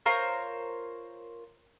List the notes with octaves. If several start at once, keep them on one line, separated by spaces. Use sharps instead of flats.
F4 A#4 C5 C#5